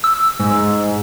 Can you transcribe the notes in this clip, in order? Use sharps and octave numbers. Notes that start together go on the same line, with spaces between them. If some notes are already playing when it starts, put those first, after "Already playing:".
E6
G#2